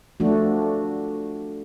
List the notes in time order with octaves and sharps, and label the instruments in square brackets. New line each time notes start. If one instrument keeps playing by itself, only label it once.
[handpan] F3 A3 D4 F#4